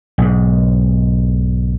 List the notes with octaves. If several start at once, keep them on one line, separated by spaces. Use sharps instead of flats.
B1 G#2